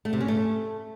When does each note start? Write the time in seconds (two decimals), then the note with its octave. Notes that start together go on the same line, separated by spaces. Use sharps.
0.05 A3
0.13 C3
0.21 C#4
0.28 A3